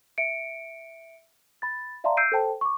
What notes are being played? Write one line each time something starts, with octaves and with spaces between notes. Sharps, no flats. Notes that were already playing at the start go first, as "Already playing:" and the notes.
E5 C#7 D7
B5 A6
D5 E5 F5 A5 A#5 C6
E6 G6 C7 D7 D#7
A4 C5 G5 A5
C#6 D6